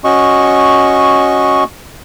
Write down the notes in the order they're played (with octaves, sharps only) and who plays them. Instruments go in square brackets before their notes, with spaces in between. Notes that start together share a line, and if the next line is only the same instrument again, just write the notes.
[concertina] C#4 F#4 D#5 C#6